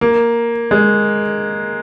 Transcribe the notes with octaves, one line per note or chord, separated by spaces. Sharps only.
A#3
G#3